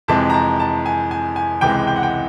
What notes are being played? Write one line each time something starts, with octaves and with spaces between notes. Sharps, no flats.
F2 C3 E3 G#3 A5
A#5
A5
A5
G#5
G#5
G#5
C#2 C3 E3 G#3 G5
G5
F#5
G5